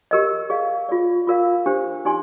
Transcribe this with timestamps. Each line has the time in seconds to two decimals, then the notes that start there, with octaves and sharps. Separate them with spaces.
0.11 G4 A#4 D#5
0.50 G#4 D5 F5
0.89 F4 G#4 D5
1.27 F4 A#4 D5 F5
1.66 D4 G4 C5
2.05 D#4 G4 D5 G#5 C6